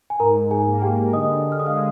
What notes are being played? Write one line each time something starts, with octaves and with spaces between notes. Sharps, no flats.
G#5
G#2 A#4 A#5
G#4 G#5
A#3
G4 G5
D3 D#5 D#6
F6
G#3 D#6
F5 F6